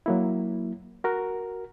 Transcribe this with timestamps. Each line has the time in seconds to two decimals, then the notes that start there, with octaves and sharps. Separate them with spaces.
0.06 F#3 A#3 E4
1.04 F#4 A#4